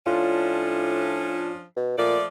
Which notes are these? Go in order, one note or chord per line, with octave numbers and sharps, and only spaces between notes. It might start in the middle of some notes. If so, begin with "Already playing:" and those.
A2 F3 C#4 D4 F4
B2
A#2 F3 A3 D5